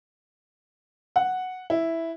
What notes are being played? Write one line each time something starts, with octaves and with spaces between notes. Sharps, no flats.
F#5
E4